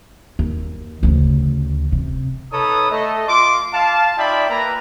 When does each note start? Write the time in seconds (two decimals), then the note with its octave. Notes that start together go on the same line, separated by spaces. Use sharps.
0.39 D#2
1.03 D2 C#3
1.92 C3
2.52 D#4 A4 B4 C#5 D#6
2.90 A3 A4 D#5
3.28 F4 C6 D6
3.73 F5 A5
4.18 D#4 F4 D5 E5 G5 B5
4.50 A#3 B4 A#5